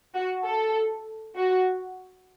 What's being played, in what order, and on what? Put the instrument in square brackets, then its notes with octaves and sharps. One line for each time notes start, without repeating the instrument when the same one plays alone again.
[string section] F#4
A4
F#4